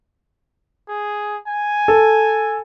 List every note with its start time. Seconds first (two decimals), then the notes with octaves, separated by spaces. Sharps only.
0.88 G#4
1.47 G#5
1.88 A4